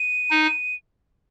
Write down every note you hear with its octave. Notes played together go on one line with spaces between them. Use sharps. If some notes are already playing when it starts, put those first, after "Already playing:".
Already playing: D#7
D#4